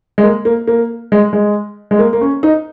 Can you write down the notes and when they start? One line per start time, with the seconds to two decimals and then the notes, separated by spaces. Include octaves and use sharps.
0.18 G#3
0.23 A#3
0.45 A#3
0.67 A#3
1.12 G#3
1.33 G#3
1.91 G#3
1.99 A#3
2.13 A#3
2.21 C#4
2.43 D#4